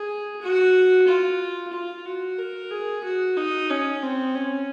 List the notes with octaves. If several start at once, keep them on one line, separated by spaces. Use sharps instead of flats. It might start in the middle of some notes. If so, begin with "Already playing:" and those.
Already playing: G#4
F#4
F4
F4
F#4
A#4
G#4
F#4
D#4
C#4
C4
C#4